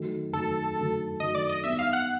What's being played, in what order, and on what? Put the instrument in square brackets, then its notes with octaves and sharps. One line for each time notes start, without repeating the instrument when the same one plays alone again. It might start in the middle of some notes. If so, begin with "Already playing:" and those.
Already playing: [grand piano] D#3 F#3 A3
[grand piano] D#3 F#3 A3 [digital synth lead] A4
[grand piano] D#3 F#3 A3
[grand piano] D#3 F#3 A3 [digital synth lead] D#5
[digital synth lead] D5
D#5
[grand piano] G3 B3 D#4 [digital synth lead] E5
[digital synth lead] F5
F#5